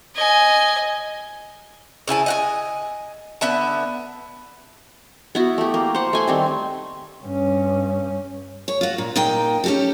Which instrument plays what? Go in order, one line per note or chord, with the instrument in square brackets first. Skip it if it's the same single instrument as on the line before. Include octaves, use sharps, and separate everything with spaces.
[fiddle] D#5 G#5
[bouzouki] C#3 E4 G#5 A5
D#5 F#5 G#5
D3 B3 E5 A5
[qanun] B3 E4 F#4
A3 G4
A#3
C5 F#5
A3 G#5 C6
D#3 G3 C4
[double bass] G2 C#4
[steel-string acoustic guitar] C#5
F4 F#4
A#2
A#2 D#4 G5
C#4 G4 A4